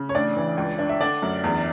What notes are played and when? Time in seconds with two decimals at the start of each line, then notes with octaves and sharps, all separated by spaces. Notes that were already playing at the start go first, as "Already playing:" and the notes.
Already playing: C#3
0.09 C#5
0.15 A1 D4 D5
0.37 E3
0.58 C#2
0.79 D4
0.89 E5
1.01 D3 D4 D5
1.22 F#2
1.44 E2